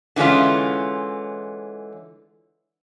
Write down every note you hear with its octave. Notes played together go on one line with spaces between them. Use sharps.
D3 E3 G#3 C#4 F4